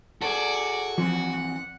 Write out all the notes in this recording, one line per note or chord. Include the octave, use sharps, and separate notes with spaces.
F#4 G#4 A4 D5
E3 F3 C4 F#5